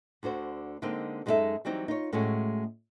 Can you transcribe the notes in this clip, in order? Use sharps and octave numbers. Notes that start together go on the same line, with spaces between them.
D2 D3 F#4 C5
D3 G#3 A#3 C4 D#4
F#2 G#3 D#4 E4 A4 E5
E3 F#3 G3 C4 D#4
D#4 F4 C#5
A2 G#3 A3 C#4 F#4